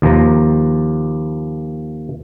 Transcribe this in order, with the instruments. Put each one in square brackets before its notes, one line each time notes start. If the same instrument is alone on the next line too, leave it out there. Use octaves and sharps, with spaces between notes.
[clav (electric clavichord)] D#2 F3 A#5